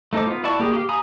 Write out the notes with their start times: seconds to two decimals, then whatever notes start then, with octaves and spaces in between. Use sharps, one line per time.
0.13 A3 D#4 A4 C5 D6
0.27 B3 F4
0.44 E4 F#4 D5 A5 C#6
0.60 A#3 G4 G#4
0.73 G4 F5
0.89 G#5 A#5 B5 D#6